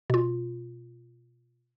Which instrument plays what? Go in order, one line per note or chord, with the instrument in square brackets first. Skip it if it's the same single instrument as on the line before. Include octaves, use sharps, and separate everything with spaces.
[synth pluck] B2 F4